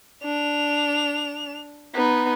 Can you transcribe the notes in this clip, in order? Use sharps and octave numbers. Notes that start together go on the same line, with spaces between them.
D4 F7
B3 D#4